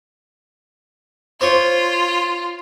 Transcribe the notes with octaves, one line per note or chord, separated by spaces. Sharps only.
F4 C5 C#5